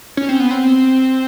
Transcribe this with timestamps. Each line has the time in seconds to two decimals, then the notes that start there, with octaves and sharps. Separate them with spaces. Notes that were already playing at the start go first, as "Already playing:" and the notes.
0.17 C#4
0.29 C4
0.40 B3
0.51 C4